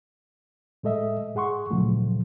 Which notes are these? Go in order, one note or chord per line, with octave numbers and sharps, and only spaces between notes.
A2 G#3 A4 D#5 E5
G#2 G#4 F#5 C6 C#6
D2 A#2 C#3 F3 F#3 A3